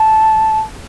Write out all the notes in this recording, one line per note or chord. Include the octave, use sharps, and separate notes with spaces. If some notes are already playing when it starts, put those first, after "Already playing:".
Already playing: A5